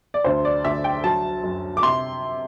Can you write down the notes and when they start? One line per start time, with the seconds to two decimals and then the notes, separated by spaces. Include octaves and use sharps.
0.14 D5
0.24 D2 C5
0.45 D5
0.65 D2 E5
0.84 G5
1.04 F#3 A5
1.43 F#2
1.77 D6
1.83 C3 C6